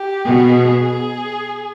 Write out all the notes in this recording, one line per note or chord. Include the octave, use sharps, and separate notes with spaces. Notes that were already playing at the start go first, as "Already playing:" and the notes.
Already playing: G4
B2 G#4
G#4